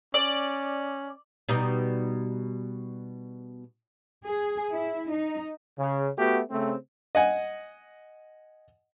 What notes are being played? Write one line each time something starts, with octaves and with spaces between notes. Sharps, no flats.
C#4 D5
B2 G3 D#4
G#4
E4
D#4
C#3
A3 B3 F#4 G4
C#3 A3 C4
D#5 F#5 G#5